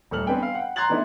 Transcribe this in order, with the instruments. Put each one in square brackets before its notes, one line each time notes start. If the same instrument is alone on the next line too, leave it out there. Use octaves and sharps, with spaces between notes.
[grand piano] D#1 A3 A4 F6 F#7
B3 C4 D4 B4 G5 G#5
F5
F#5 G5
A#5 C6 F#6 G#6 A6 F#7
D#3 A3 B3 D4 E4